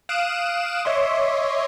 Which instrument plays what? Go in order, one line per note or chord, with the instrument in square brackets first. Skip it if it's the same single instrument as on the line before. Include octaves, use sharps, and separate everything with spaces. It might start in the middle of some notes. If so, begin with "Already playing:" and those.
[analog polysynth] F5 D#6 F#6 D7 E7
C#5 D#5 E5 C6 D6